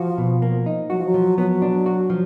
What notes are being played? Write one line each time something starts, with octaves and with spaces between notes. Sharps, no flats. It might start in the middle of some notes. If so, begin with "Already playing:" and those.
Already playing: F3 F#4
B2
A#3
D#4
F#3 F#4
F3
F#3
F3
F#3 B3
D4
F#4
F3